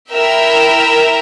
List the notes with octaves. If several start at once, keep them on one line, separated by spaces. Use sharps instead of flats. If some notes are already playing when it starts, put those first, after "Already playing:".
E4 A#4 E5 G5